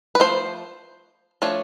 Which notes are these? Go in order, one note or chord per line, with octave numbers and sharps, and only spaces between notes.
B4
F3 A3 C5
F3 A3 D4 C#5